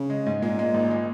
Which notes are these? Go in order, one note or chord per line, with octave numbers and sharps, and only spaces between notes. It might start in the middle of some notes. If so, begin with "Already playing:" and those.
Already playing: C#3
G#3
G#2
A#2 G#3
G#3
G#1
G#3